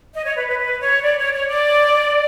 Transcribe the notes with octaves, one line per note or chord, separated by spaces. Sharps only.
D#5
C#5
B4
B4
B4
C#5
D5
C#5
C#5
D5